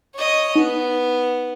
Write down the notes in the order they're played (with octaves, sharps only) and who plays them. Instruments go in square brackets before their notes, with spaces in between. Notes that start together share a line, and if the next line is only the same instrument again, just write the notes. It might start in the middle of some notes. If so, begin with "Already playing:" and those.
[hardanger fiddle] C#5 D#5
[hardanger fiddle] B3 [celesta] D#4